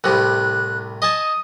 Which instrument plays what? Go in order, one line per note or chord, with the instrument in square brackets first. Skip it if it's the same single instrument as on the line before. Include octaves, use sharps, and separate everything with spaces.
[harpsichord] C2 A2 C3 [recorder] F#6
[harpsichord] D#5 G#5 A5 [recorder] D#6